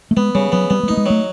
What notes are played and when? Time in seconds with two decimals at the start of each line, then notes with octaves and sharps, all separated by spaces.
0.11 A3
0.17 G#3 B3
0.35 C#3 G3
0.52 F#3 B3
0.70 G3 B3
0.83 G#3
0.88 A3 D#4
0.97 G#3
1.06 F#3 A3